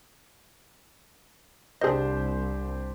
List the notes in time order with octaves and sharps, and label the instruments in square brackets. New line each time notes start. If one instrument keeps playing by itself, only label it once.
[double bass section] C2 [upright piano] D4 G4 C5 [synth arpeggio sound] G#4 A#4 D#5